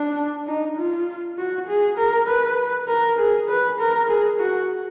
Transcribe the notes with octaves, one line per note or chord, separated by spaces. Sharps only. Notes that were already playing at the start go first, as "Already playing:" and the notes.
Already playing: D4
D#4
F4
F#4
G#4
A#4
B4
A#4
G#4
B4
A#4
G#4
F#4